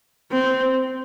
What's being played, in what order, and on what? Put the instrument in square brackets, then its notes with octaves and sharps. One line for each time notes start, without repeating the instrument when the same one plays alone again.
[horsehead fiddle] C4